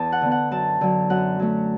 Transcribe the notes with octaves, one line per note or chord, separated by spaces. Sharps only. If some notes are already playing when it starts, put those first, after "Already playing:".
Already playing: E2 A5
F#5
D3 B3
F#5
F#2 A5
D3 F#3
F#2 F#5
F#3 A3